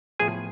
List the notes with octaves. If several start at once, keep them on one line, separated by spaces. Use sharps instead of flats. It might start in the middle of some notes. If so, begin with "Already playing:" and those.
A2 F3 B3 G#4 G#5